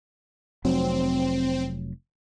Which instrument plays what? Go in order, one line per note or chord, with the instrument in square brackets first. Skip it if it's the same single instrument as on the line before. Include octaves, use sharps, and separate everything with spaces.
[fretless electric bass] F1 F#3 [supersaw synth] C4